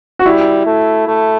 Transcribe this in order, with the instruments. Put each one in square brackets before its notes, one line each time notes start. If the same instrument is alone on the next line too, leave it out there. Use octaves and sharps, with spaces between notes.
[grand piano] F#4
[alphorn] G3 [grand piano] E4
[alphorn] A3
A3